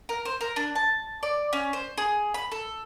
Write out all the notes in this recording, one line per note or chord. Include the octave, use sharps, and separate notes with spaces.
A#4
C5
A#4
D4
A5
D5
C#4
C5
G#4
B5
A4